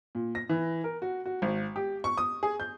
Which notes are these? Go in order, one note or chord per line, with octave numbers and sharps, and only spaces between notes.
A#2
A#6
E3
A#4
F#4
F#4
G#1
G4
C#6
D#6
G#4
G6